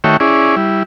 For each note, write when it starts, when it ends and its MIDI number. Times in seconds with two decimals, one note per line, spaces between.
0.04 0.17 51
0.04 0.17 57
0.04 0.17 66
0.04 0.17 73
0.04 0.17 76
0.04 0.17 79
0.20 0.56 61
0.20 0.56 64
0.20 0.56 68
0.20 0.56 74
0.56 0.83 55
0.56 0.83 64